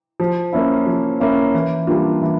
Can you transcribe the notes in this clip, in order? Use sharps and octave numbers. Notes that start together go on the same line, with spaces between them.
F3
A#3 C#4 E4
F3
A#3 C#4 E4
E3
G3 A#3 D4 F4
E3